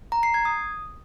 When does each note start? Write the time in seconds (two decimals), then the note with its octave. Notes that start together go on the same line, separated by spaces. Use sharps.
0.12 A#5
0.23 C7
0.34 G#6
0.45 D#6